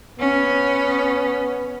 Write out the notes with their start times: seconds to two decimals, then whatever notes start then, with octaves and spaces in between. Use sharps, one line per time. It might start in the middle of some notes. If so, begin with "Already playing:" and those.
0.19 B3 C#4